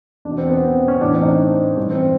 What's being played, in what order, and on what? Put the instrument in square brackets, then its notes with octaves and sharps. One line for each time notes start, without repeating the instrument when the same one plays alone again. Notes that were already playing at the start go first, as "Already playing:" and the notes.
[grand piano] E2 D4
B2
C4
B3
C4
C#4
A2 E3 D4
C4
D#4
D4
G2 E3 C#4
C4